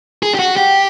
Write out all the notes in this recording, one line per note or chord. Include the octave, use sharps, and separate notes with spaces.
G#4
G4
F#4
G4